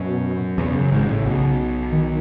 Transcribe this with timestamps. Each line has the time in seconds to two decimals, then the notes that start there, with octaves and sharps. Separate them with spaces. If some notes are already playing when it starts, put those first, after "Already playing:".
Already playing: F#2 B2
0.58 E2 C#3
0.75 F#2
0.92 G#1 G#2
1.08 A1 A2
1.25 B1 B2
1.92 D#3